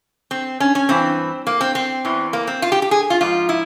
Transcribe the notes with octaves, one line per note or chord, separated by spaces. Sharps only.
C4
C#4
C#4
G2 E3 C4
A#3
C4
C4
E2 E3
A#3
C4
F4
G4
G4
G#4
F4
G#2 F3 F4
E4